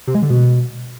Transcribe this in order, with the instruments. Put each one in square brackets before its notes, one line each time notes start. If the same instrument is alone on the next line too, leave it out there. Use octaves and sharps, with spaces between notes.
[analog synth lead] C3
G#3
D3
B2